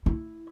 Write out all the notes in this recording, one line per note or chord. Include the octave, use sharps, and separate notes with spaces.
E4